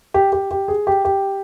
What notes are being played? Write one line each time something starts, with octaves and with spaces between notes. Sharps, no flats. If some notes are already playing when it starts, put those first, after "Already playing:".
G4
G4
G4
G#4
G4
G4